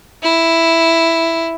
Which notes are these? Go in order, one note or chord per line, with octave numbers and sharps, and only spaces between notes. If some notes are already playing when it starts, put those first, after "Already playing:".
E4